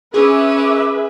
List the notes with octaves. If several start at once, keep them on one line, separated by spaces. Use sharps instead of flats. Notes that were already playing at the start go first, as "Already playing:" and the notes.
C#4 G#4 B4 E5 D6 E6